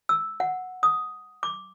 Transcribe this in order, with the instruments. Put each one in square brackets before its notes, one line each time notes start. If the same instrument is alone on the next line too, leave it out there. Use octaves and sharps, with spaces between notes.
[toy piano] E6
F#5
D#6
D6